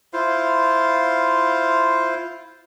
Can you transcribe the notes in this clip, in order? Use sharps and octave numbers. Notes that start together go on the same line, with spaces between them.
E4 F4 C5 F5